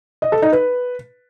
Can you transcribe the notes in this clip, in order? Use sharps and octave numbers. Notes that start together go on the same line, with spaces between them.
D#5
A4
D#4
B4